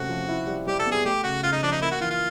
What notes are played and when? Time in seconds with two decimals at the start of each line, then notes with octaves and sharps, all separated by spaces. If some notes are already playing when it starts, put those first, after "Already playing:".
Already playing: C3 A3 C#4 F#4
0.09 F3
0.28 E4
0.47 G3
0.67 G3 G4
0.79 A4
0.86 B3
0.92 G#4
1.05 A3 G4
1.24 C#3 F#4
1.44 C#3 F4
1.52 D#4
1.63 F3 D4
1.72 D#4
1.81 A#3 E4
1.91 F#4
2.00 E3 F4
2.11 F4